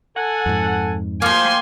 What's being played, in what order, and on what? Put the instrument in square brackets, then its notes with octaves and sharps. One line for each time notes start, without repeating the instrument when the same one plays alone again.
[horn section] A4 F#5 G#5
[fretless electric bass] F2 G#2
[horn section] F3 [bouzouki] A#3 G5 [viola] G#5 C6